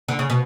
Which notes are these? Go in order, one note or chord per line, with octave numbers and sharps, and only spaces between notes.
D3
C#3
B2